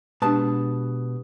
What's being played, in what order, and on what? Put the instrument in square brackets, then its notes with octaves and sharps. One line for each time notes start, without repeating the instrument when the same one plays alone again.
[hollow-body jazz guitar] B2 A5 [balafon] G#3 D4 [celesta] G4 B4 D#6